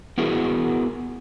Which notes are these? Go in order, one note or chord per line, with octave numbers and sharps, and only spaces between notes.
B3 E4 F#4 G#4 A#4